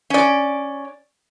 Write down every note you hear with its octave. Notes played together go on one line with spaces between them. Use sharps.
C#4 D5